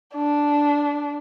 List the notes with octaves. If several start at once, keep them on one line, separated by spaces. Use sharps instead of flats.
D4